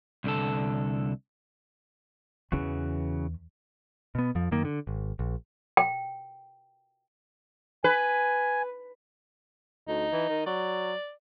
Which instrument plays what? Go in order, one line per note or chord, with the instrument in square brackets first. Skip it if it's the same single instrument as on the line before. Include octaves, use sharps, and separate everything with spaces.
[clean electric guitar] C2 D3 A4
[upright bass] E2 [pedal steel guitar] C#3 E3 F#4
[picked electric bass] B2 B3
F2 F3
F#2 D#3 A#3
D3
G#1
A#1
[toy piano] G5
[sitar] B4 [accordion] G#5
[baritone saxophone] D2 [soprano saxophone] D#4
[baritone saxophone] E3
D#3
[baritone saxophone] F#3 [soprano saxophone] D5